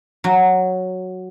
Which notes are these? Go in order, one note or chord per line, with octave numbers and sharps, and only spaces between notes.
F#3